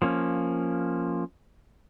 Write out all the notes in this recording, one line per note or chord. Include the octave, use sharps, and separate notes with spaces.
F3 A#3 C#4